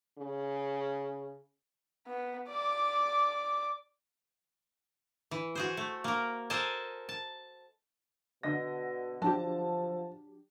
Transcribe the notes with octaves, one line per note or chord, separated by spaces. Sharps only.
C#3
B3
D5 D6
E3
F#4 G#4 C5
A3
A#3 A#4
A4 A#4 C5 D#5 G#5 A5
A5
B2 D3 D#5 A#6
F3 F#3 D4 G4 A5